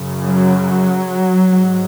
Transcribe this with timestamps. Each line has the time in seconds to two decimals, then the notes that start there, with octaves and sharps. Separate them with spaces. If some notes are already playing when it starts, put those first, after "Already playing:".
Already playing: F#2 C#3
0.25 F#3
1.51 G#2